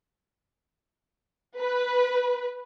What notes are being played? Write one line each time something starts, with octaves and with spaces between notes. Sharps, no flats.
B4